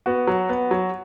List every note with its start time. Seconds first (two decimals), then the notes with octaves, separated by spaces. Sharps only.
0.06 B3 F#4
0.27 F#3
0.49 B3
0.71 F#3